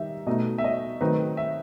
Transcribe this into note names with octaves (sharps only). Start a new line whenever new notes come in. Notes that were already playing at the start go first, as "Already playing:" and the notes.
Already playing: D#3 G3 D#4 E5
B2 A3 D#4 D#5
E5
D#5
D#3 F#3 A3 C4 D#4 B4
E5